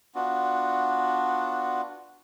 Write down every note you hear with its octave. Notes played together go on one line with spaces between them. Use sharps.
B3 D4 F4 F#4